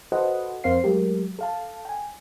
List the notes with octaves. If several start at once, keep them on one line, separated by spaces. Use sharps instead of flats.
F#4 A4 B4 C5 D#5 F#5
F2 C4 A#4 C5 F5 C7
F#3 G#3 A3 G4 A#4
A4 F5 A5
G5 G#5